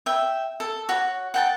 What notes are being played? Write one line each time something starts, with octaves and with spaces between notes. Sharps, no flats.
E5 G5
A4
F#4 C#5
F#5 G5 A5